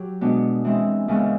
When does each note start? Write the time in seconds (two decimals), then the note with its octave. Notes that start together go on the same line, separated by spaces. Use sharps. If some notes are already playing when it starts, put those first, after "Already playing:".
Already playing: F#3 G4
0.21 B2 G#3 B3 D4
0.64 E3 G#3 C4 E4
1.08 D#2 C#3 E3 G#3 B3